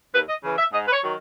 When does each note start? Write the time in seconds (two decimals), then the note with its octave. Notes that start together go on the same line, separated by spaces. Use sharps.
0.13 D#2 B4
0.29 D#5
0.43 C#3 E3
0.58 E5
0.73 G#2 D#5
0.87 B4
0.93 C#5
1.03 D#3 F#3